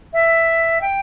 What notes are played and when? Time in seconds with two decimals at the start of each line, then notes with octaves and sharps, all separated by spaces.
0.13 E5
0.81 G5